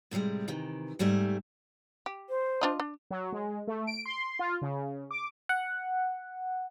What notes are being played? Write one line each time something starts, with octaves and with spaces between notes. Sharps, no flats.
A2 C3 F3 G3 G#3
C3 D#3 E3
G#2 C3 G3 A3 G#5
G4
C5
D4 F4 D#5
D4
F#3
G#3
A3
D7
C6
F4
C#3
D6
F#5